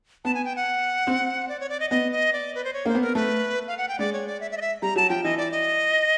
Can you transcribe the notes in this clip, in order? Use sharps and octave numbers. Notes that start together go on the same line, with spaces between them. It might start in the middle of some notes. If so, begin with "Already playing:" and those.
B3 A5
G#5
G5
F#5
C4
D5
C#5
D5
D#5
B3 D#5
D#5
D5
B4
C5
C#5
A#3 C5
B3
A#4
A3 B4
F5
F#5
G5
G#3 D5
C#5
D5
E5
E5
D#5
E5
G3 A#5
F#3 A5
F3 G5
E3 D#5
D5
D#5